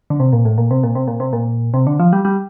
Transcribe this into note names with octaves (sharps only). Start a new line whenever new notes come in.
D3
C3
A#2
A2
A#2
C3
A#2
C3
A#2
C3
A#2
C3
D3
F3
G3
G3